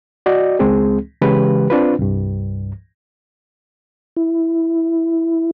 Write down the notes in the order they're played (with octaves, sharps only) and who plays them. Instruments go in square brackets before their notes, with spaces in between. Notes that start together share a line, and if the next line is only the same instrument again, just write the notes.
[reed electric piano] F#4 D5 D#5
C#2 G#3 C4 G#4
C#3 E3 G#3 G4 B4
C4 D4 F4 B4
C2 G2
[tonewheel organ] E4